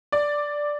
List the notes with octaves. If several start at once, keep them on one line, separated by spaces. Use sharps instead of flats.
D5